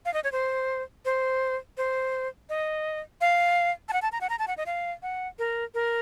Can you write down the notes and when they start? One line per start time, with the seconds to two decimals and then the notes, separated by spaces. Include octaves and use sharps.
0.05 F5
0.14 D#5
0.24 C#5
0.32 C5
1.05 C5
1.77 C5
2.49 D#5
3.21 F5
3.89 A5
3.93 F#5
4.02 A5
4.12 A#5
4.21 F#5
4.30 A#5
4.39 A5
4.48 F#5
4.57 D#5
4.66 F5
5.03 F#5
5.39 A#4
5.74 A#4